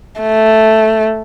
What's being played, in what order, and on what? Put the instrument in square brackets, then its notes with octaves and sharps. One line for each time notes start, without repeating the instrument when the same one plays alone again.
[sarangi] A3